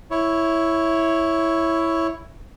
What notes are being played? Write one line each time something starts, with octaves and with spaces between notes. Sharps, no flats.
E4 C#5